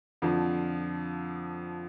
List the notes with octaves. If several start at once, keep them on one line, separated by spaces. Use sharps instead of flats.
F2 D3 F3